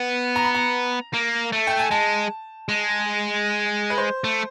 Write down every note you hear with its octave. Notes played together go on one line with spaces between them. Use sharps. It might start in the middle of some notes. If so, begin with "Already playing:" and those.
Already playing: B3
A#5
B5
A#5
A#3
A3
G5
G#5
G#3 A5
G#3
B4
C5
A3